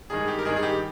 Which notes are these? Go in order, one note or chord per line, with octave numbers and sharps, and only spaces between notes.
G2 D#3 G#3 G#4
G4
A#4
G2 D#3 G#3 G#4
G#4
G4